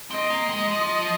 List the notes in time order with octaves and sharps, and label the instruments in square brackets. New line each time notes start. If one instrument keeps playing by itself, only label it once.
[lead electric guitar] C4 [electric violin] D#5
[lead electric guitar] A#3
G#3
F3